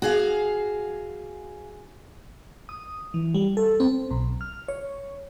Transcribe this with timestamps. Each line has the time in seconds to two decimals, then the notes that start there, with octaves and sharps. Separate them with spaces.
0.02 F#4 G#4 F5
2.69 D#6
3.14 E3
3.35 G3
3.57 A4
3.80 C4
4.11 B1
4.41 F6
4.68 C#5